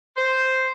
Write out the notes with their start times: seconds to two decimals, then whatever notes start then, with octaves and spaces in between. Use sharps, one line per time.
0.17 C5